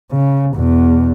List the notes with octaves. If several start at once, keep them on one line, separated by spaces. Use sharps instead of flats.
C#3
E2 B2